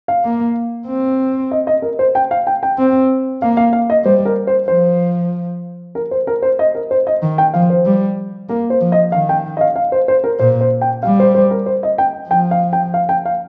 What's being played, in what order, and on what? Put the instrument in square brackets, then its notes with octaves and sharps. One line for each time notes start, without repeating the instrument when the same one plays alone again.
[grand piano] F5
[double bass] A#3
C4
[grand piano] D#5
D#5
A#4
C5
G5
F5
G5
G5
[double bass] C4
[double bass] A#3 [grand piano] F5
[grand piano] F5
F5
D#5
[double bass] G3 [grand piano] C5
[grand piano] A#4
C5
[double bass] F3 [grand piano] C5
[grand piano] A#4
C5
A#4
C5
D#5
A#4
C5
D#5
[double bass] D#3
[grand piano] G5
[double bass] F3 [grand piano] F5
[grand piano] C5
[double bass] G3
[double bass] A#3 [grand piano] A#4
[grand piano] C5
[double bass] F3
[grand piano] D#5
[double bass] D#3 [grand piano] F5
[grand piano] G5
D#5
F5
F5
C5
C5
A#4
[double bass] A#2 [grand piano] C5
[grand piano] C5
G5
[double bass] G3 [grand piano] F5
[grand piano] C5
C5
A#4
C5
D#5
G5
[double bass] F3 [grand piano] G5
[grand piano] F5
G5
F5
G5
F5